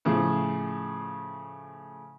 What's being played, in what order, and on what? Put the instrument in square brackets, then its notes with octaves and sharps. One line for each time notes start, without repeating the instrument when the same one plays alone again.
[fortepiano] A2 C#3 F3